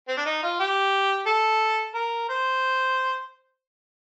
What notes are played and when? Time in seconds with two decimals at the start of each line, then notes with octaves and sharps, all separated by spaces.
0.08 C4
0.17 D4
0.26 D#4
0.43 F4
0.60 G4
1.27 A4
1.95 A#4
2.29 C5